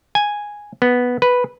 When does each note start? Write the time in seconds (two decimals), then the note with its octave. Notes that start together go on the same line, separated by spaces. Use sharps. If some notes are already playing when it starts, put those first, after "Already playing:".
0.15 G#5
0.82 B3
1.22 B4